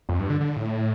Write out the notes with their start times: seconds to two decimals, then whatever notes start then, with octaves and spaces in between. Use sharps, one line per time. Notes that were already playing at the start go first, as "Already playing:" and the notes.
0.09 F2
0.19 G2
0.30 D3
0.40 D3
0.56 A2